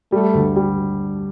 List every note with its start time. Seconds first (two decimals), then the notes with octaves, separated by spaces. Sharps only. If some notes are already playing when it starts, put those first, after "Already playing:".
0.12 G3 A3
0.34 D2
0.56 G3